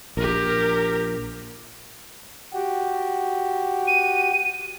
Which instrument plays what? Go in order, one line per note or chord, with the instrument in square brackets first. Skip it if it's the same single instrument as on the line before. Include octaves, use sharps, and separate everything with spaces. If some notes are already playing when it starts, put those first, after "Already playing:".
[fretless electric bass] A#1 [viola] G4 A#4
[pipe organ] F#4 G4
[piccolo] D#7